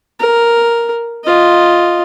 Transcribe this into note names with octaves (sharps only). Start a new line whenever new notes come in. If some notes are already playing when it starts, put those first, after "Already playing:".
A#4
F4 D#5